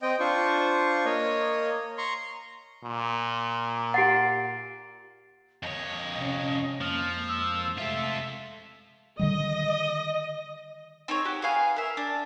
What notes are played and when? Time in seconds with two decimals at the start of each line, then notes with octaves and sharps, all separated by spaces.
0.02 C4 D#5 G5
0.20 D4 F4 C5 C#6
1.05 A#3 C#5 D#5
1.98 A#5 C6 C#6
2.85 A#2
3.94 G4 F#5 A6 C7 D7
5.63 F2 C#5 D#5
6.14 C3 C#4
6.81 F2 F3 G#3 A#3 F6
7.29 E6
7.77 C3 G#3 A3 F4 A4 E5
9.19 D3 D#3 G3 D#5
11.08 C4 D#4 G#4 C#5
11.25 F#4 G4
11.42 G#4 B4 F5 G#5
11.76 A#4 E5
11.97 D4